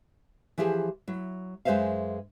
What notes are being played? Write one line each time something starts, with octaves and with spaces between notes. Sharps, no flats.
E3 F3 E4 G4 G#4
F#3 E4
F#2 G#3 B4 C5 E5 F5